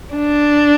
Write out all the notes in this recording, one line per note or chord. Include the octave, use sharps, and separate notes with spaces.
D4